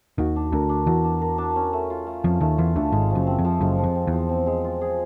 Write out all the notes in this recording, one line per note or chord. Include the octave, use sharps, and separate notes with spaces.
D#2 D#3 F#4
D4
D2 D3 A#4
D4
E2 E3 F#4
D4
A#4
D4
C#4
A3
F4
A3
F2 F3 C#4
D#2 D#3 A3
E2 E3 F4
D2 D3 A3
G#1 G#2 G#3
F3
F#1 F#2
C4
F2
F3
F#1 F#2 G#3
F3
F2
C4
E2
F3
C4
G#3
F4
G#4